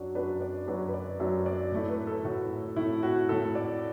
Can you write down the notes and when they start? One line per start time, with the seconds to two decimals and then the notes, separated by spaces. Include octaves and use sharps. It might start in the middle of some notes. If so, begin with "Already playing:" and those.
Already playing: F#2 F#3 D4 D5
0.15 F#2 F#3 D4 B4
0.41 D5
0.68 F#2 F#3 D4 B4
0.88 B4
0.94 D5
1.20 F#2 F#3 D4 E5
1.46 D5
1.72 A2 A3 E4
1.89 B4
2.07 A4
2.24 A2 A3 E4 F#4
2.76 A2 A3 E4
3.03 F#4
3.29 A2 A3 E4 A4
3.55 D5